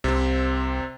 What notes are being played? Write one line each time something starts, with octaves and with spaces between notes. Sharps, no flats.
C2 C3 C4